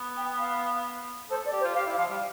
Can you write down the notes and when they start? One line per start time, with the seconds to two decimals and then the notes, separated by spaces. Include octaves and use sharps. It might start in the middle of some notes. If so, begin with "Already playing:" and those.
Already playing: B3
0.17 G5
0.39 F5
1.31 A4 C5
1.46 D5
1.52 G4
1.60 C5
1.64 F4
1.75 G4 F5
1.86 E4
1.98 F3 F5
2.09 G3